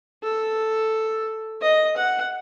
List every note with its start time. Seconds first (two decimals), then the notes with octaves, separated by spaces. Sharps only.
0.23 A4
1.62 D#5
1.97 F#5